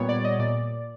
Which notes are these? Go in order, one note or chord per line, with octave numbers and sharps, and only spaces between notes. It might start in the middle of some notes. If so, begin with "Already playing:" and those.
Already playing: A#2 G3 B3 C#5
D5
D#5
A#2 D5